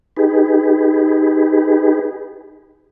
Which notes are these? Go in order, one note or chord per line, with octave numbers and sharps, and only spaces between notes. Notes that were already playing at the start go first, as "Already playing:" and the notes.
D#4 G4 G#4 B4